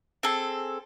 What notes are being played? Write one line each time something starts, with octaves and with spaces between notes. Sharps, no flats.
C4 G#4 A4